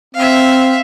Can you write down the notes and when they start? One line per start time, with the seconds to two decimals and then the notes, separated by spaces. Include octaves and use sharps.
0.15 C4 E5 F5